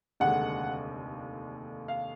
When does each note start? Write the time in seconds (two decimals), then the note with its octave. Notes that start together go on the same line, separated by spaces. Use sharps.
0.20 F1 D#2 D3 G#3 F#5
1.88 F5